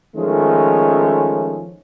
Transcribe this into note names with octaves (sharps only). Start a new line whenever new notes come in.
D#3 F3 G#3 A3 C#4